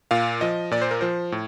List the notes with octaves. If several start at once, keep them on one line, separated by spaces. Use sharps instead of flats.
A#2 F5
F3 D#5
A#2 D5
C5
A#4
F3 C5
A2